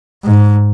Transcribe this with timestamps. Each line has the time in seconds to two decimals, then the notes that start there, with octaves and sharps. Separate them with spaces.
0.24 G#2